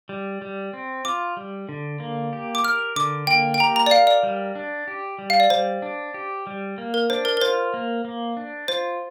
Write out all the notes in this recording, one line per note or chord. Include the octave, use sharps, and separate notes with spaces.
G3
G3
C4
F4 D6
G3
D3
A#3
G4
D6
A#4 F6
D3 D6
A#3 G5
G5
G4 A#5
A#5
D5
A#4 F5
D5
G3
D4
G4
G3
F5
D5
G3 C5
D4
G4
G3
A#3
A#4
D4 C5
A#4
A#4
F4 C5
A#3
A#3
D4
F4 C5